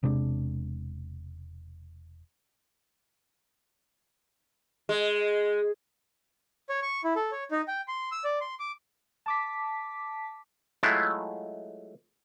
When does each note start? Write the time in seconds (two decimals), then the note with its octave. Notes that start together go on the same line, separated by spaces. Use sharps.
0.03 E1 C3 G#3 D4
4.89 G#3
6.69 C#5
6.82 C#6
7.04 E4
7.16 A4
7.32 C#5
7.51 D#4
7.68 G5
7.88 C6
8.12 E6
8.24 D5
8.41 C6
8.60 D6
9.26 A5 D6 B6
10.83 F#3 G#3 A3 E4 F4